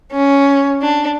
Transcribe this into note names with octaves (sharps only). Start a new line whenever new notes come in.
C#4
D4